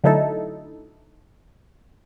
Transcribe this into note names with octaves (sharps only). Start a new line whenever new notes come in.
D3 F#3 A3 D#4 E4 A4